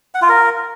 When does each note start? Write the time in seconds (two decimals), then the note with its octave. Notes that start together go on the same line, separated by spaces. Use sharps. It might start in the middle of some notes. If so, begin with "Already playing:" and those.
0.15 F#5
0.22 F4
0.29 A#4